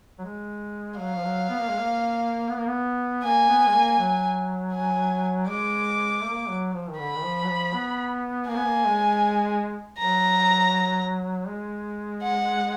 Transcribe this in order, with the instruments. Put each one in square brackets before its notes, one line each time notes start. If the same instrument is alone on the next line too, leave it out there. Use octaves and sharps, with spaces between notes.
[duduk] F#3
G#3
[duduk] F#3 [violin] F5
[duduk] F3
F#3
B3
A#3
G#3
A#3
B3
A#3
B3
[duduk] A#3 [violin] G#5
[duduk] B3
G#3
A#3
F#3
[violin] G#5
[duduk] G#3 [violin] D6
[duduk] A#3
F#3
F3
D#3
[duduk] D3 [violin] B5
[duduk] D#3
F3
F#3
F3
B3
[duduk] A#3 [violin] G#5
[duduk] B3
A#3
G#3
[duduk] F#3 [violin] A#5
[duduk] G#3
[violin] F#5